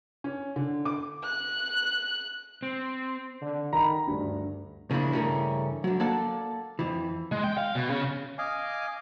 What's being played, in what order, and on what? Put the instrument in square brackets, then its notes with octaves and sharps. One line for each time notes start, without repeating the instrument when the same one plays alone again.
[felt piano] C#4
D3
D6
[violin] F#6
[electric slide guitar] C4
[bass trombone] D3
[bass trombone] D#3 [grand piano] A#5 B5
[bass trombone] D2 [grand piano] G2
[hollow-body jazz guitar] C#3 F3 A#3 D4 E4
G2 C#3 E3 A3 C#4 A#4
D3 F#3
A#3 A4 D5 F#5 A5
F2 E3
[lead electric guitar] G#3
G5
F5
B2
C#3
[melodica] D#5 F5 G#5 D6